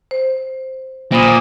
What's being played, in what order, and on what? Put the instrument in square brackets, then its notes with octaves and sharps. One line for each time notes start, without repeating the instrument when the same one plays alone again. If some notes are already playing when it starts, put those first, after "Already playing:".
[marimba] C5
[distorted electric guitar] A#2 [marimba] C5 B5 D#6